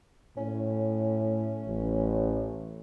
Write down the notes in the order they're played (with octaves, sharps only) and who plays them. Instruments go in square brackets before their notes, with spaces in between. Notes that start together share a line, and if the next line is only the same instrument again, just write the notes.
[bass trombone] A2 [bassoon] C#4
[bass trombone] A1